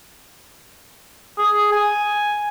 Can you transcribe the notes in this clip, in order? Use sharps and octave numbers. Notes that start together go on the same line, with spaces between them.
G#4
G#5